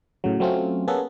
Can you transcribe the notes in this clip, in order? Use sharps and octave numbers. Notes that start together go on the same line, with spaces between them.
A2 C#3 F#3
F#3 A3 C4 C#4 F4
A#3 B3 C#4 G#4 A4 B4